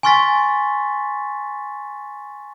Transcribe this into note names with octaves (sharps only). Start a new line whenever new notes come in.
G#5 C6 C#6 F6 A6 B6